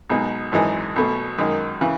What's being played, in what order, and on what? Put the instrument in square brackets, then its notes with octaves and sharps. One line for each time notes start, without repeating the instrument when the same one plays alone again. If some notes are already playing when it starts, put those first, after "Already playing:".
[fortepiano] B1 B2 G#3 D#4
G#1 F#2 E3 G#3 D#4
B1 B2 A3
F#2 D#3 G#3 D#4
C#3 E3